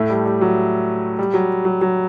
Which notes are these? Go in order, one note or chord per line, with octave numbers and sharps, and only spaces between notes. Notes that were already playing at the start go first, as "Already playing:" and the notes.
Already playing: A2 A3
G3
G3
F#3
G3
F#3
F#3
F#3